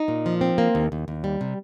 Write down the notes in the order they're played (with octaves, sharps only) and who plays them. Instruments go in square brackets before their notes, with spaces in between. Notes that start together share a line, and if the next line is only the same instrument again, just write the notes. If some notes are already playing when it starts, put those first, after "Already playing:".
Already playing: [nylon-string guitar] D#4
A#2
F3
C4
A#3
D#2
D#2
D#2
G3
C3